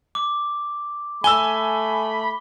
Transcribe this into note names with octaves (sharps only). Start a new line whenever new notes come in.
D6
A3 G#5 B5 E6 G7